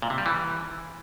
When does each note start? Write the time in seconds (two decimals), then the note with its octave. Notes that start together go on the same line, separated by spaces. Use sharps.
0.02 A#2
0.10 C3
0.18 G3
0.26 E3